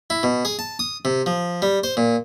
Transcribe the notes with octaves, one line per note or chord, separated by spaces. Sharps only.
E4
B2
G#4
A5
D#6
C3
F3
G3
C5
A#2